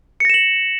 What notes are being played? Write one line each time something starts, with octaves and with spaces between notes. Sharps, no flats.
A#6 C#7 E7 F#7